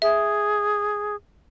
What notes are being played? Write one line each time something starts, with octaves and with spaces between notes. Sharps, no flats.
G#4 E5